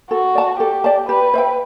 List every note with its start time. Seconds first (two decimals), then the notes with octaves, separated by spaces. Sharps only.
0.11 F#4 A4
0.35 D5 A5
0.60 G4 A4
0.84 D5 A5
1.09 G4 B4
1.34 C5 E5 G5